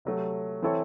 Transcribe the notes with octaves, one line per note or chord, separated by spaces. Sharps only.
C3 F#3 A3
E3 C4 E4 A4 C#5